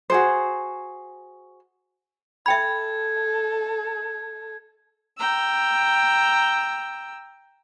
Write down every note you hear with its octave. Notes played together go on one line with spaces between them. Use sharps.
F#4 G#4 C5
A4 E5 G5 B5 G#6
G5 A#5 E6